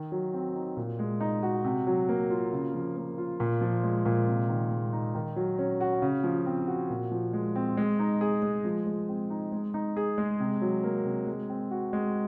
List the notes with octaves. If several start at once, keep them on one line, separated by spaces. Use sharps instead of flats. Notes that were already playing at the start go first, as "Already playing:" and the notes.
Already playing: D#3
F#3
C4
D#4
A#2
G#3
D#4
F#4
C3
F#3
A#3
F4
C#3
F3
A#3
F4
A#2
F3
G#3
A#2
C3
D#3
G#3
D#4
D#3
F#3
C#4
F#4
C#3
F3
C4
F#4
A#2
F3
G#3
C4
G#3
D#4
G#4
G#3
F3
G#3
C4
D#4
G#3
D#4
G#4
G#3
C3
F#3
A#3
C3
G#3
C4
F#4
G#3